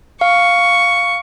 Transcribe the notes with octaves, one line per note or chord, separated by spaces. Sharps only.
F5 C#6